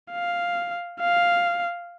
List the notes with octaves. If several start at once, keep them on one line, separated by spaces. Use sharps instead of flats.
F5
F5